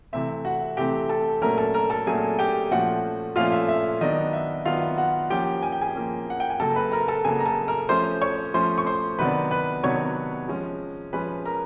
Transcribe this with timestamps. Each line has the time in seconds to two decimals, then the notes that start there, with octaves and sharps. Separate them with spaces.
0.13 C3 E3 A3 C4 E5
0.45 F#4 F#5
0.77 C3 E3 A3 C4 G4 G5
1.09 A4 A5
1.42 A#2 F#3 A3 C#4 A#4 A#5
1.58 A4 A5
1.74 A#4 A#5
1.90 A4 A5
2.07 A#2 F#3 A3 C#4 G#4 G#5
2.39 G4 G5
2.71 A#2 F3 A3 C#4 F#4 F#5
3.36 A#2 F3 A3 C#4 F4 F5
3.52 E5
3.68 E5
4.01 D#3 F#3 B3 D4 D#5
4.33 E5
4.65 D#3 F#3 B3 D4 F4 F5
4.97 F#4 F#5
5.30 F3 A#3 C#4 G4 G5
5.63 G#5
5.72 G5
5.82 G#4 G#5
5.95 F3 A#3 C#4
6.30 F#5
6.40 G5
6.50 G#5
6.60 C#3 F#3 A#3 A4 A5
6.76 B4 B5
6.92 A#4 A#5
7.08 A4 A5
7.25 C#3 F#3 A#3 G#4 G#5
7.40 A#5
7.46 A4 A5
7.68 A#4 A#5
7.89 F3 A3 C#4 C5 C6
8.22 C#5 C#6
8.54 F3 A3 C#4 C5 C6
8.78 C#6
8.86 C5 C6
9.19 C3 D#3 F#3 B3 D4 B4 B5
9.51 B4 B5
9.83 C3 D#3 F#3 B3 D4 C#5 C#6
10.48 F3 G#3 C#4
11.13 F3 G#3 C#4 B4 B5
11.46 A#4 A#5